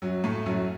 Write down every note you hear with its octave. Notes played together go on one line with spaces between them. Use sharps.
F#2 F#3
A2 A3
F#2 F#3